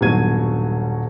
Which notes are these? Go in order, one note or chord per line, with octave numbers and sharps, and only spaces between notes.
D#1 G2 B2 F#3 G#6 D#7